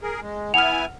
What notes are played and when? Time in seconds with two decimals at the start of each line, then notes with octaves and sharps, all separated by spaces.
0.01 G#4 A#4
0.21 G#3
0.54 B3 E4 F#5 G#5 F6 F7